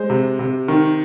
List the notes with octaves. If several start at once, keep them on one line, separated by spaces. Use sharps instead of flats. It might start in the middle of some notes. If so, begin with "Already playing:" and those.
Already playing: G#3 C5
C3
C3
D#3